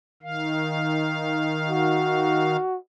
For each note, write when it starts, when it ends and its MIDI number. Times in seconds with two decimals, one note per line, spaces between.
0.22 2.56 51
0.22 2.56 77
1.68 2.77 66